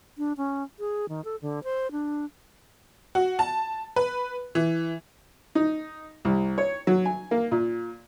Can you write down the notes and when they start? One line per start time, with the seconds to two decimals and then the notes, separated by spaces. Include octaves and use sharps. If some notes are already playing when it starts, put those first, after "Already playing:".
0.18 D4
0.37 C#4
0.79 G#4
1.09 D#3
1.25 A4
1.42 D3
1.64 C5
1.92 D4
3.15 F#4
3.39 A5
3.96 B4
4.55 E3
5.55 D#4
6.25 C2
6.58 C#5
6.87 F#3
7.05 G#5
7.31 A#3
7.51 A#2